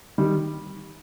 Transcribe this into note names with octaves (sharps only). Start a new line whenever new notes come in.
D#3 G3